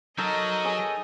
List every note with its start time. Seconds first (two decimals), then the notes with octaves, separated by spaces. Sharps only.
0.18 F#3 D#4 A4 A#4 D#5 A#5
0.65 G#4 C#5 E6